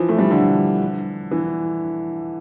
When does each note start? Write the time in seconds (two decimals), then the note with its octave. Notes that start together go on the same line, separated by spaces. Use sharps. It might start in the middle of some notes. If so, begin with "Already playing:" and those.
Already playing: E3 F3
0.09 A3
0.19 G3
0.31 D3
1.31 E3